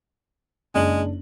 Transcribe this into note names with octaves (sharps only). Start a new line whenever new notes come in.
F#1 G#3 D4 F#7